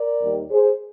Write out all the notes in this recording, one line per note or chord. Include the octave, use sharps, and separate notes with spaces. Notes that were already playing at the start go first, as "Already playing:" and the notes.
Already playing: A#4 D5
D#2 D#3 G3
G#4 C5